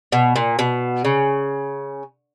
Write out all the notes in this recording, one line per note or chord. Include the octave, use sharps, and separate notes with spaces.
B2
A#2
B2
C#3